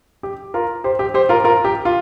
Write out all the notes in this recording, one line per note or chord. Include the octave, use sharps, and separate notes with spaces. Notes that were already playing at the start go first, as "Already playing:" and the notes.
G4
F4 A#4
G4 C5
G4
G4 C5
F4 A#4
F4 A#4
G4
F4